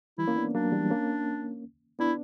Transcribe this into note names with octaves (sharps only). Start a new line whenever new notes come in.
E3 G3 E4
A#3 C#4
B3 D4
F#3 A#3 D4
E3 G3
A#3 C#4
B3 D4 E4